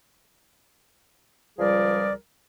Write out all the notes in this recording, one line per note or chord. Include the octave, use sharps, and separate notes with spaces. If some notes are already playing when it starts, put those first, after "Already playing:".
C#2 F3 G3 G#4 A#4 D5